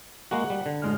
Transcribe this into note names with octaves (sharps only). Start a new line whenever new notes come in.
G#3 A#3 F#4 F#5
G3
D3
A1 G#3 F6